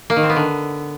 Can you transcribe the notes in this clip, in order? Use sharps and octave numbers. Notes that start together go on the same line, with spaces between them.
A#3
D#3
C4
B3
D3